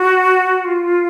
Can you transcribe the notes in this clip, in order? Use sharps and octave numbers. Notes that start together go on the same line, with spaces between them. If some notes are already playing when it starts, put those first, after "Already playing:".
Already playing: F#4
F4